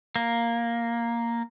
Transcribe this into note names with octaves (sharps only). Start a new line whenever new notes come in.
A#3